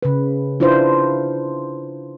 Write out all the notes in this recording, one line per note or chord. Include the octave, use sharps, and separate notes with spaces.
C#3 B4
D4 E4 F4 B4 C5